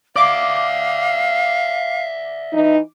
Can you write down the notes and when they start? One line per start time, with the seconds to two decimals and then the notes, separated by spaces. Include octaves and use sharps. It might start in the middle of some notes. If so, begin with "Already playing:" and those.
0.16 D5 E5 F5 D6
2.53 E3 D#4